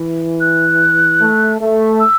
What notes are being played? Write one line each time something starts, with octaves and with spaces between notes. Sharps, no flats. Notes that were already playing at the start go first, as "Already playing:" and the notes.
Already playing: E3
F#6
A3
A3
E6